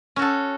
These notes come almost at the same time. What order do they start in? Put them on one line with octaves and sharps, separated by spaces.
C#4 F#4 A4